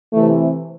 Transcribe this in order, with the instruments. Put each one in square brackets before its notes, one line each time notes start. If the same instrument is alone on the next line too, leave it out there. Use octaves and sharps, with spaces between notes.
[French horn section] C3 E3 A3